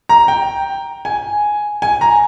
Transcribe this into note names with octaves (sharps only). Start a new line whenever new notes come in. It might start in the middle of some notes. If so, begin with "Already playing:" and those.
A#5
G5
G#5
G#5
A#5